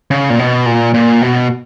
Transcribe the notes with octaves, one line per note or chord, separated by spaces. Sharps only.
C#3
A#2
B2
A#2
A#2
B2